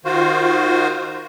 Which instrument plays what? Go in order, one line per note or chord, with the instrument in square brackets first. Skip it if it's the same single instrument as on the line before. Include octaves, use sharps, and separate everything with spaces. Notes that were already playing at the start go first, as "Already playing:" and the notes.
[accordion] D#3 F4 F#4 C5